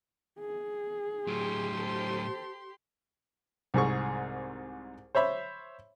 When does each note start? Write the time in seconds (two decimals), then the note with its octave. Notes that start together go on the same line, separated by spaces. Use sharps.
0.40 G#4
1.27 A2 F#3 G4 C6
1.78 A4 C5
3.74 C2 G#2 G#4 C#6
5.15 C5 C#5 E5 B5